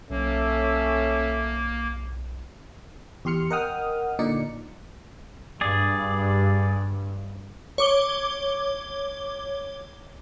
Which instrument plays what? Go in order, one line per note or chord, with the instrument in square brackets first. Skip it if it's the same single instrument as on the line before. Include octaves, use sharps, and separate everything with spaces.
[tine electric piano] B1 [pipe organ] A#3 [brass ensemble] C#4 A4 E5
[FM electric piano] E2 G4 C6 F6 C#7
A#4 D#5 F#5 G5 D#6 F6
A#2 D3 D#4 D5 C#7
[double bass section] G2 [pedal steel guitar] G#4 D5
[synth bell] C#5 D6 G7